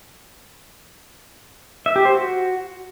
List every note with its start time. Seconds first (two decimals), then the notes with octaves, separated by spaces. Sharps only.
1.86 E5
1.96 G4
2.05 C5
2.15 F#4